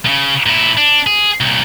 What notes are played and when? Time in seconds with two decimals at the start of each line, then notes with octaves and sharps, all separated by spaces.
0.05 A2 C#3
0.46 A#2 E4
0.77 D4
1.07 G#4
1.41 C2 A#2